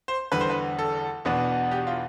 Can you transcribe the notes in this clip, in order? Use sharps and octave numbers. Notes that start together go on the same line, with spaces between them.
C5
E2 D3 G3 B4
C5
B4
A4
E2 B2 B3 D4
G4
F4